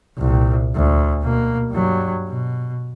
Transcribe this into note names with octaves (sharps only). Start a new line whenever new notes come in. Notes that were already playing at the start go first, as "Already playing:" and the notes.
C2 A#2
D2
B2 A#3
G2 F#3
B2